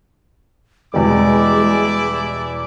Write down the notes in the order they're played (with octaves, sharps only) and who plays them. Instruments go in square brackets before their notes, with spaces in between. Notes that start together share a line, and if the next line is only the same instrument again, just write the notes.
[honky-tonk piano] E2 B2 G3 [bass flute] G#3 [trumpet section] E4 D5 D6